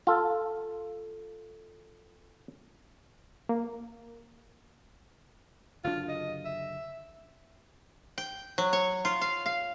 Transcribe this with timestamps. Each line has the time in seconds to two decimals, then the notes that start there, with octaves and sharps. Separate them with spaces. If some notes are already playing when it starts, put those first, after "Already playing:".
0.07 F4 A4
3.49 A#3
5.84 F#1 D3 D4 F4
6.09 D#5
6.45 E5
8.18 G5
8.58 F#3
8.73 C#5
9.05 F4
9.21 F5
9.46 F5